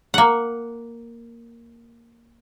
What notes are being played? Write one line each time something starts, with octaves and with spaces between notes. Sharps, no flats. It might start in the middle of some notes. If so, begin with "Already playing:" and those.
A#3 F#5